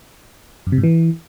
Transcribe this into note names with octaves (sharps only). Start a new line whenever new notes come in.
F#2
C3
G#2
E3